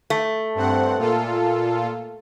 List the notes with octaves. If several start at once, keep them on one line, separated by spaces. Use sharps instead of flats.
A3
G2 C4 F#5
A#2 F4 A4